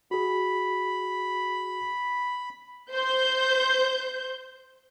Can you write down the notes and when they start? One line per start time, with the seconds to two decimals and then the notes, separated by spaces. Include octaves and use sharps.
0.11 F#4 G#4 B5
2.93 C5 G6